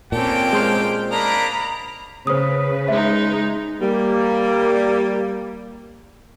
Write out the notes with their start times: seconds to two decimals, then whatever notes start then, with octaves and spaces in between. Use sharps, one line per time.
0.12 A#2 A#3 C4 C#4 G4 A4 G5
0.53 G#3 C5 F6
1.11 A#3 D4 D#5 A#5 B5
2.27 C#3 B4 C5 D#6
2.88 G#3 D#4 E5
3.82 G3 A#3